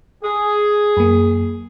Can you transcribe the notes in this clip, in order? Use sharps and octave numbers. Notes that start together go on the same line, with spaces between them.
G#4
F#2 A#3